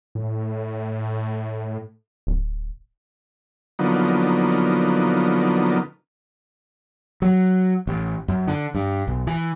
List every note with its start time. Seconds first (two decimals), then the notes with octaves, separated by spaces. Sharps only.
0.15 A2
2.27 D1
3.79 D3 F3 F#3 A#3 B3 D#4
7.22 F#3
7.87 A1
8.28 F#2
8.47 D3
8.75 G2
9.07 B1
9.27 E3